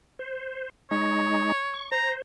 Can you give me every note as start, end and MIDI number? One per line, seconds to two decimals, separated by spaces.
0.19 0.69 72
0.91 1.52 56
0.91 1.52 63
0.91 1.86 73
1.74 1.90 85
1.92 2.22 72
1.92 2.11 82